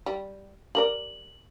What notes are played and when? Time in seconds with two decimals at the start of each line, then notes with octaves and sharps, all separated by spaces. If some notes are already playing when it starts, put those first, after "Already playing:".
0.06 G3
0.75 G4 A#4 D5 F#7